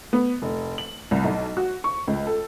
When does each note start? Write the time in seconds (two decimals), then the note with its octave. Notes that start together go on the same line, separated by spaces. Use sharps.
0.13 B3
0.42 F1
0.78 F#7
1.11 C2
1.24 B1
1.57 F#4
1.84 C#6
2.07 C#2
2.27 A4